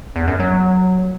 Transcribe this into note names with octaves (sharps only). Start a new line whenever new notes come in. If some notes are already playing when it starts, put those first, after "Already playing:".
E2
F#2
F#3